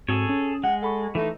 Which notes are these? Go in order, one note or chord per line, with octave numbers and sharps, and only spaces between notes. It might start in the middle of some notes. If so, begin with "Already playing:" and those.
G#2 C4 F#4 G#4 A4 C#5
C#4
G#3 F#5
A4 F#5 B5 C#6
E3 A3 D#4